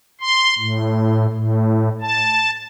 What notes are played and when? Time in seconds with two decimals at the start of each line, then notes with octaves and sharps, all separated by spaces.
0.21 C6
0.58 A2
1.33 A2
2.01 A5